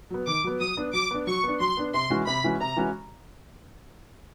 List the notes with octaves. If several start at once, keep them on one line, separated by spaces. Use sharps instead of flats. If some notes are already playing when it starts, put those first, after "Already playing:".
F#3 B3
D#3 D6
F#3 B3
F#3 D#6
B3 D4
F#3 D6
B3 D4
F#3 C#6
B3 D4
F#3 C6
B3 D4
C3 C6
E3 G#3 C#4 F#4
C3 B5
E3 G#3 C#4 F#4
C3 A#5
E3 G#3 C#4 F#4